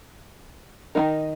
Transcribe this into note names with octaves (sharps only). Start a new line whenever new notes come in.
D#3 A#3 D#4 A#4